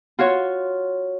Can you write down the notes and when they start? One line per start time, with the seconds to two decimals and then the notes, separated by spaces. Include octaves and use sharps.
0.19 F4 F#4 C#5